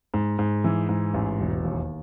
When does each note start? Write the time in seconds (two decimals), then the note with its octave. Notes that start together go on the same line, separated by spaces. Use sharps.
0.14 G#2
0.39 G#2
0.64 E3
0.89 G#2
1.14 A1
1.40 E1
1.65 D#2